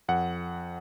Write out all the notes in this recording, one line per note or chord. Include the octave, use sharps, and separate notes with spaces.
F2 F#5